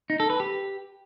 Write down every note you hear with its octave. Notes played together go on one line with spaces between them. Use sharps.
D#4
A4
B4
G4